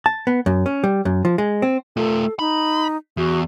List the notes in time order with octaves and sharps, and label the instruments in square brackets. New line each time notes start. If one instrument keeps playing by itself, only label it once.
[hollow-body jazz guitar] A5
B3
F#2
C#4
G3
F#2
F3
G#3
C4
[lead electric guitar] A3 F4 [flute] A4
[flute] D#4 [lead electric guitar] B5
[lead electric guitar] E2 [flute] F#4